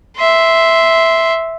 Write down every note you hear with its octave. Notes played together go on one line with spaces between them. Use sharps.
E5 C6